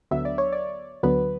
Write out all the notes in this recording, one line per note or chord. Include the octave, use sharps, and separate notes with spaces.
D2 D3 F#3 B3 E5
D5
C#5
D5
D2 D3 F#3 B3 B4